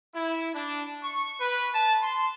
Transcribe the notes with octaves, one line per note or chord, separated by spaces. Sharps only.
E4
D4
C#6
B4
A5
C6